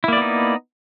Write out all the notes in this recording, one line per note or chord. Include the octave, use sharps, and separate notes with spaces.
A#3 B3 D#4 E4 D5